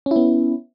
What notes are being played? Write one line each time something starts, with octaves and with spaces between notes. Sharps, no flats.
B3 C#4 E4